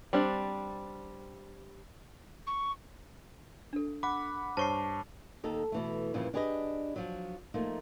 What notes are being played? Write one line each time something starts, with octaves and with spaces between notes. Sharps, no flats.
G3 C4 D4
C#6
D4 A4
F#5 B5 D6
G2 C5 C#5 A5 C#6 C7
D#2 D#4 A4
B2 E3 A3
G2 A#2 C#3 E3 F3
D4 G4 G#4 B4 C#5 D#5
F3 F#3
F3 A3 A#3 D#4